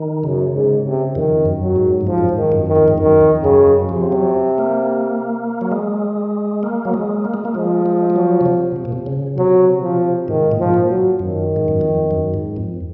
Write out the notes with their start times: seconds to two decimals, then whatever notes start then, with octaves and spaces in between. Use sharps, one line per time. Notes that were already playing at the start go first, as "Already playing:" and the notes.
Already playing: D#3
0.24 F#2 C#3
0.54 G#2
0.85 C3
1.15 F2 D#3
1.46 F#2
1.61 F#3
1.76 G#2
2.01 F#2
2.06 G#2 F3
2.18 F#2
2.29 G#2
2.37 D#3
2.52 F#2
2.68 D#3
2.75 F2
2.88 G#2
2.98 F#2 D#3
3.21 F2
3.36 F2
3.43 F#2 C#3
3.67 F#2
3.89 C3 F3
4.12 F#3
4.58 A#3
5.61 F#3
5.71 G#3
6.63 A#3
6.85 F#3
6.94 G#3
7.25 A#3
7.34 G#3
7.45 A#3
7.54 F3 G#3
7.86 G#3
8.10 G#3
8.16 F#3
8.41 C#3
8.46 C3
8.76 C3
8.85 A#2
8.92 C3
9.06 C#3
9.37 C3 F#3
9.83 F3
10.28 G#2 D#3
10.52 A#2
10.59 G#2 F3
10.74 A#2
10.89 F#3
11.19 F#2 D#3
11.56 G#2
11.68 F#2
11.81 F2
12.11 F#2
12.34 G#2
12.56 F2